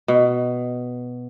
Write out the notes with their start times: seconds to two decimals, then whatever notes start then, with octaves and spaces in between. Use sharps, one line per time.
0.08 B2